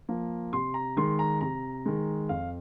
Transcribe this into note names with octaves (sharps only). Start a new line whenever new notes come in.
F3 A#3
C3 C6
A#5
D#3 G#3 C6
A#5
C3 A#5
D#3 G#3
F2 F5